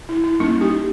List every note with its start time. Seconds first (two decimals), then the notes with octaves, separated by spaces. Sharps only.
0.09 E4
0.24 E4
0.40 G3 A#3 C#4 D#4
0.61 G4